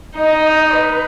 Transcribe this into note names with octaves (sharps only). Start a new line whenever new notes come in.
D#4 D#5
D#5
B4